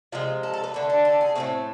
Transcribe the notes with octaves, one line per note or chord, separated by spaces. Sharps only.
C3 F3 G#3 F4
A4
A4
B4
D3 A3 A4
A4
A4
G#4
A2 F3 A3 C4